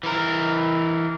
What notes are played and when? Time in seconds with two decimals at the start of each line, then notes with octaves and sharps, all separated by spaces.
0.03 E3 A#4